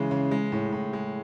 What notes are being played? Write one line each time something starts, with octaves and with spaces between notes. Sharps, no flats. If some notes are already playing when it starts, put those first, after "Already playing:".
Already playing: C#3 E3 G#3
C#3
G#3
A2
A2
G#3